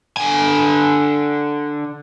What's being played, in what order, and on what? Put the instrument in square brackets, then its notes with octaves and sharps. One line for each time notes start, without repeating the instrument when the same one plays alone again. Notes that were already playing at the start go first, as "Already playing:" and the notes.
[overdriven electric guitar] D3 G#5